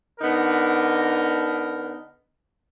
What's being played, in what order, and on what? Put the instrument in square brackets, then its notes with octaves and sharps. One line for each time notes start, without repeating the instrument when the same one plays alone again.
[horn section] D3 B3 D#4 A#4